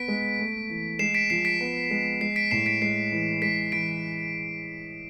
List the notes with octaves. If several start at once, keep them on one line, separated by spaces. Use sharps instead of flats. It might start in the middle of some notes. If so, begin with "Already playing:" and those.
Already playing: B3 B6 D7
G#3
A3
E3
G#3 C7 E7
B6 D7
F3 C7 E7
B6 D7
B3
G#3
G#3 C7
B6 D7
A2 C7 E7
B6 D7
G#3 C7
E3
G#3 B6 D7
E3 B6 D7